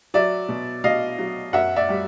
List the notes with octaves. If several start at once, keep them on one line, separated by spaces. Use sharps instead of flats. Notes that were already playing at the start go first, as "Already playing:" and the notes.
F#3 D5 E5
B2
B2 D#5 F5
F#3
F#2 E5 F#5
D5 E5
G3